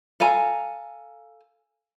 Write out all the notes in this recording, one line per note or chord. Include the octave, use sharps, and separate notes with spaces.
A4 F5 G#5 A#5